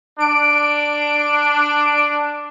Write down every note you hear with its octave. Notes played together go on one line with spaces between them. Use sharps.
D4 D7